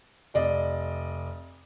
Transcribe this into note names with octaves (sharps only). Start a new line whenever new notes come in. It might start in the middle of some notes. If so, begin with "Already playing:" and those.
F1 D5 D#5